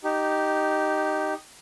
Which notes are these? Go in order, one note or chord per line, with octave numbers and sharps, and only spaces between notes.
D#4 G4